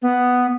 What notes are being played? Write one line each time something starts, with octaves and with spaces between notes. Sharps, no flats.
B3